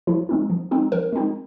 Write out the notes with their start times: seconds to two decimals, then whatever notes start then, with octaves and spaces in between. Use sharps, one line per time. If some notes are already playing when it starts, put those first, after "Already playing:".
0.07 F3 E4
0.29 G#3 C4 D#4
0.50 F3
0.71 G#3 C4 D#4
0.92 F3 A#4
1.13 G#3 C4 D#4